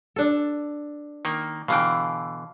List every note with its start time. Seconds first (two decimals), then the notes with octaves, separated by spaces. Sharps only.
0.16 D4 A4
1.25 D#3 A#3
1.68 B2 D3 E3 F5 G5